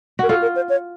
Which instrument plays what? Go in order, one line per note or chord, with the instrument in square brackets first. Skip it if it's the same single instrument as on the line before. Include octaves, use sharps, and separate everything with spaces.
[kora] F#4 [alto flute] A#4
[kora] F4 [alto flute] A4
[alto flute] A#4
C5
C#5